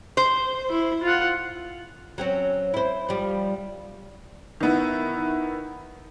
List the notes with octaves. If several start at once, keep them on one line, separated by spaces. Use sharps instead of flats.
C5
E4
F4 F#5
F#3 C4 C#4
E4 C5
F3 G3
D#3 B3 E4